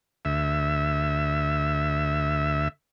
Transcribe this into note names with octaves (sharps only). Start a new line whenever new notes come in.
D2 E5